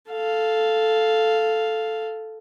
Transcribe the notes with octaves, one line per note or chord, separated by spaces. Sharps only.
A4 F5